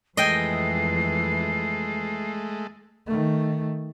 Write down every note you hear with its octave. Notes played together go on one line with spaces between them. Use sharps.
F2 E3 G#3 A3 D#5 G5 G#5 C7
D#3 A3